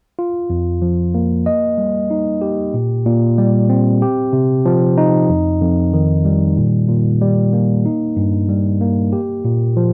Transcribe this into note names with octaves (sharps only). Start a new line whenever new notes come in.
F4
F2
F3
A#3
D#5
G3
D#4
G4
A#2
A#2
G3
C4
G4
C3
F3
D#4
F2
F2
D#3
G3
A#2
A#2
G3
A#3
D#4
G2
G3
A#3
G4
A#2
F3